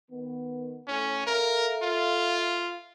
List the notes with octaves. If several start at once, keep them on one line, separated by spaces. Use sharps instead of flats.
D#3 B3
A2 C#4
A4 A#4 E5 F5
F4